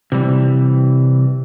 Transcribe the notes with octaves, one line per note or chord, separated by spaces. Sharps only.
C3 E3 G3